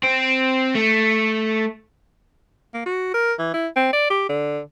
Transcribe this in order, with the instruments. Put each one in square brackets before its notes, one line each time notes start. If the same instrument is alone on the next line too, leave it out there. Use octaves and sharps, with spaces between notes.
[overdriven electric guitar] C4
A3
[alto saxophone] A#3
F#4
A#4
E3
E4
C4
D5
G4
D3